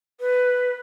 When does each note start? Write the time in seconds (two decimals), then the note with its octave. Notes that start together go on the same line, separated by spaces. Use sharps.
0.20 B4